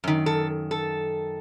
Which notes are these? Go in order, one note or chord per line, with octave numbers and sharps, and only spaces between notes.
F#2 D#3
A4
A4